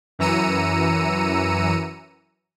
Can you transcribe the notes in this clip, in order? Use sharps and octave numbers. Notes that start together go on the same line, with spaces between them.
F#2 E3 A#5 E6 C#7 D#7